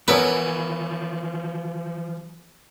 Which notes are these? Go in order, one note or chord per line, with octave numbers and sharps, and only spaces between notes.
E3 F3 B3 E4 A#4 B4 C#5 G#5